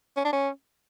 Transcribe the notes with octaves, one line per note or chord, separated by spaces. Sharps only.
C#4
D4
C#4